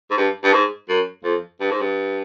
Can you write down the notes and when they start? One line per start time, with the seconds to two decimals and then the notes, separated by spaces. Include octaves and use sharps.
0.10 G#2
0.17 G2
0.44 G2
0.53 G#2
0.89 F#2
1.24 F2
1.60 G2
1.71 G#2
1.80 G2